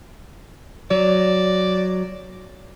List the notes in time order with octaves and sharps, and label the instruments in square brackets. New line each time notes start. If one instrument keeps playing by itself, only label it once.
[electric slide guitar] F#3 [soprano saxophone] D5